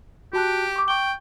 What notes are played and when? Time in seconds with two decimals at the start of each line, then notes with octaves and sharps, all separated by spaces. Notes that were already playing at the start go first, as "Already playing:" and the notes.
0.33 F#4 G4 A5 F#6
0.76 C#6 D6
0.88 G5 C#6 G7